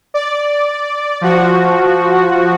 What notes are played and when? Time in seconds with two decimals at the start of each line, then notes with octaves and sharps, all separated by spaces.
0.14 D5
1.21 F3 F#4